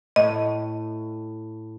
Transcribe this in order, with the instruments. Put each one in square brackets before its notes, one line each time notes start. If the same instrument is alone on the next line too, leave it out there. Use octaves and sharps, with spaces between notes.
[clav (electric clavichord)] A2 [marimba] D#5